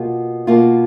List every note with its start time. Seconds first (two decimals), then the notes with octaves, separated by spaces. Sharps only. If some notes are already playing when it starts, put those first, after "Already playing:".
Already playing: B2 A#3 F4
0.47 B2 A#3 F4